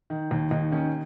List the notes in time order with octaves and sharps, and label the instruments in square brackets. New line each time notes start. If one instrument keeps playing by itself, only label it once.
[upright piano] D#3
D#2
D#2 D#4
D#3 C#4